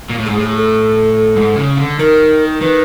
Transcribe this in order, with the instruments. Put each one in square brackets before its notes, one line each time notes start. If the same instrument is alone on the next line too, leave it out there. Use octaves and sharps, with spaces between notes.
[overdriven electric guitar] A#2
A2
[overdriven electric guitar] G#2 [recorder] G#4
[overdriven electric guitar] A2 [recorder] G#4
[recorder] A4
[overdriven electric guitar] G#2
C#3
D3
[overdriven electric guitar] D#3 [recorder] A#4
[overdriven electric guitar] D#3 [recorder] B4